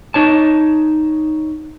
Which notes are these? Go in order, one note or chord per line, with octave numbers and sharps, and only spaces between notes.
D#4 C#5 A5